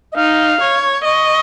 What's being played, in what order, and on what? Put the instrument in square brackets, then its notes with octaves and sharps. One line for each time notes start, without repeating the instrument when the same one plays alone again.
[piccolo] D#5
[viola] D#4 [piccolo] F5
[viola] C#5
[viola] D#5 [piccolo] C#6